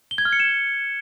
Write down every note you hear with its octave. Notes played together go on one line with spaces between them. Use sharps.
G7
G#6
F6
C#7
E7